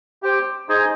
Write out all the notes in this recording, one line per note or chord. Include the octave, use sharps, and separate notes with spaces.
G4 C5 G5
D#4 G#4 C5 D#5